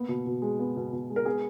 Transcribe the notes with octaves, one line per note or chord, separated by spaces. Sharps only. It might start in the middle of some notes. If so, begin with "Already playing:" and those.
Already playing: A#3 B3
B2
B2
G#3
B3
B2
B2
G#3
A#4
B3 G#4